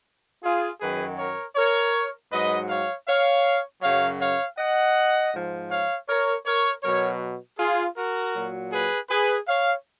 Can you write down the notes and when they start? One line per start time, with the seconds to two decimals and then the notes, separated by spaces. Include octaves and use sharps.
0.43 F4 G#4
0.80 F#2 D#3 F#3 G#4 B4
1.18 A#4 C#5
1.56 A#4 C#5
2.32 G#2 F#3 B4 D#5
2.69 C#5 F5
3.07 C#5 F5
3.82 F#2 C#3 F#3 C#5 F5
4.19 C#5 F5
4.58 D#5 F#5
5.33 G#2 F3
5.70 C#5 F5
6.08 A#4 C#5
6.46 A#4 C#5
6.83 B2 F#3 A#4 C#5
7.58 F4 G#4
7.96 F#4 A#4
8.34 A#2 F#3
8.72 G#4 B4
9.10 G#4 B4
9.47 C#5 F5